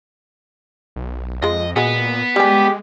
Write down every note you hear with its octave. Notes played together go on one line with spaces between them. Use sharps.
B1
F2 G#3 F4 D#5
A#2 G#3 B3 F#4 G#4
G3 G#3 G4 G#5